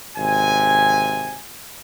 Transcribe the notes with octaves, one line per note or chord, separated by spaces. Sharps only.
G#1 C3 G#5